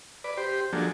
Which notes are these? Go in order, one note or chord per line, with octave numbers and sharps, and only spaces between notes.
B4 D5
G4 C5
F3 F#3 A#3 D4 G#4 A4